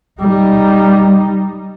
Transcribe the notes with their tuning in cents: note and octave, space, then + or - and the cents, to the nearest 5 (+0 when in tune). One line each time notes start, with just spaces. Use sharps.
G3 +0 D#4 +0